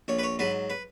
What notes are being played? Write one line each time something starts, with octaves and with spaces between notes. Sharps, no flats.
A#1 C#5
B4
C#5
G#2 F#3 B4
B4